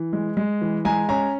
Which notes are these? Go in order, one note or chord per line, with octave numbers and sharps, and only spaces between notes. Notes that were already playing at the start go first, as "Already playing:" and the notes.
Already playing: E3
G#3
G#3
E3
G#3 G#5 A#5
C#4 G#5 A#5